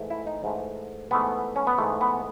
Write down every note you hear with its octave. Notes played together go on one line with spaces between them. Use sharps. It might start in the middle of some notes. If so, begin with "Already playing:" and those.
Already playing: G#2 E3 A3
E4
D#4
G#2 E3 A3
G#2 E3 A3 B3
C#4
B3
G#2 E3 A3
B3